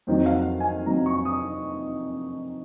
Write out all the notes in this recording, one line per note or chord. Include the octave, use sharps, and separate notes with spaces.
F2 D#3 F#3 C5
F5
F#5
G#5
F2 D#3 F#3 A#5
C#6
D#6